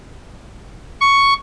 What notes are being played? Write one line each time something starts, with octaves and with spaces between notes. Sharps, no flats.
C#6